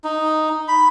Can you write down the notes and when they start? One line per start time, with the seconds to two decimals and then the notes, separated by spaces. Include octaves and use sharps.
0.04 D#4
0.68 B5